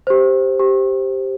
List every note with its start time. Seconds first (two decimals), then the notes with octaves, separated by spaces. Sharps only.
0.07 G4 C5
0.59 G4